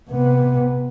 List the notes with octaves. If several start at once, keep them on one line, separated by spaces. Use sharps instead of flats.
C3 B3